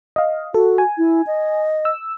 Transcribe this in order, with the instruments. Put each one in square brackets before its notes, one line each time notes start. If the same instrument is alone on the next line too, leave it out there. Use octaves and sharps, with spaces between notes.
[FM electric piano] D#5 F5
[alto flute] F#4 [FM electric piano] A4
[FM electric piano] G#5
[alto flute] E4
D#5
[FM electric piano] E6